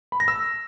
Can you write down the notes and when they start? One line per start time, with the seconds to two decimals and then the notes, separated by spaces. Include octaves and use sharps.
0.12 B5
0.20 A#6
0.28 E6